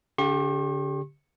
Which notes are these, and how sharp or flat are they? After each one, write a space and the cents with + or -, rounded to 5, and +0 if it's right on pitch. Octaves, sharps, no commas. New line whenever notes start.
D3 -45 G4 +0 C#6 -45